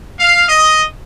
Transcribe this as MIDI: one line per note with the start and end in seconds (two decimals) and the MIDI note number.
0.20 0.47 77
0.49 0.82 75